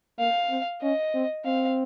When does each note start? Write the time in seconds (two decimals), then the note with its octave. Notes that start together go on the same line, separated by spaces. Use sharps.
0.19 A#3 F5
0.50 C4
0.82 C#4 D#5
1.14 C4
1.45 C4 F5